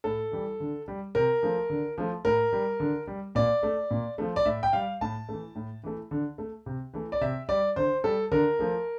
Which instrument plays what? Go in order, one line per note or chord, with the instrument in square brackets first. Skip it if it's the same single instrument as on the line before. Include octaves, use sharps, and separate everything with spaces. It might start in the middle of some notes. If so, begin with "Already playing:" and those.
[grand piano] A2 A4
E3 G3
D3
G3
C3 A#4
F3 A3
D3
F3 A3
A2 A#4
G3
D3
G3
A#2 D5
A3
A#2
F3 A3
D5
A2 E5
G5
G3 F5
A2 A5
E3 A3
A2
E3 A3
D3
A3
C3
E3 A3
D5
C3 E5
G3 D5
D3 C5
G3 A4
D3 A#4
F3 A3